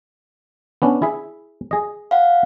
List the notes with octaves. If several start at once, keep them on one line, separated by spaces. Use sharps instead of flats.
B3 C#4 D4
E4 G#4 E5
G#4 D#5
F5 F#5